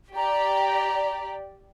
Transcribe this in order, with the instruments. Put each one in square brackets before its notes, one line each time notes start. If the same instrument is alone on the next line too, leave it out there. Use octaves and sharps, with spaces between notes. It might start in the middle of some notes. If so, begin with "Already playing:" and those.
[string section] G4 D5 [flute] A#5